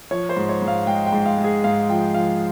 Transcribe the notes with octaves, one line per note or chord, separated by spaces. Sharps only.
F3 C#5
C5
G#2
C#5
G#2
F5
G#3 G5
G5
G#2
F5
G#3
G#4
G#2 F5
F3 G5
F3 F5